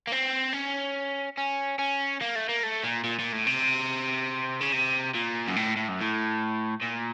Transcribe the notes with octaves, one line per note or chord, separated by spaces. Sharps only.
A#3
C4
C#4
C#4
C#4
A#3
A3
A#3
A3
A#2
A#2
A#2
A2
C3
C#3
C3
A#2
F#2
A2
A2
F#2
A2
A#2